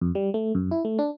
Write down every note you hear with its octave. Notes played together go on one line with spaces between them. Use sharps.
F2
G3
A3
F#2
E4
A3
D4